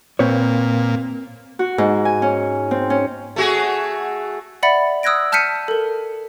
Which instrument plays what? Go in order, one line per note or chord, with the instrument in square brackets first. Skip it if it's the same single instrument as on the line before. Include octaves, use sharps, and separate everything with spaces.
[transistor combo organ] A#2 [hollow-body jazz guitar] C4 B4 C#5
[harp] F#4
G#2
G#5
C#4
C4
C#4
[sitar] A3 F#4 G#4
[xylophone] D5 E5 F#5 B5 A6 C#7
D#6 E6 F#6 G#6 A#6 D7
A5 F6 G6 B6 C#7 D#7
A4 A#4